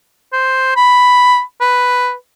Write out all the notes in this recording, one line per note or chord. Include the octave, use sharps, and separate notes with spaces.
C5
B5
B4